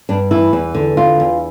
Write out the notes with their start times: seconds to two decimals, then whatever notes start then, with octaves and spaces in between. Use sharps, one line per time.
0.09 G2 D4
0.31 E3 E4
0.53 E2
0.75 D3
0.97 E2 F4
1.20 E2